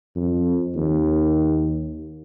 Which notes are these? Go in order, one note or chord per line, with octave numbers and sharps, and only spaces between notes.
F2
D#2